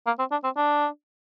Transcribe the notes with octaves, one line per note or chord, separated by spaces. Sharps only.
A#3
C4
D4
C4
D4